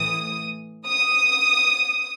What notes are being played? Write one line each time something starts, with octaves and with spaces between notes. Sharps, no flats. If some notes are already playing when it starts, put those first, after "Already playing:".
Already playing: A2 E3 D#6
D#6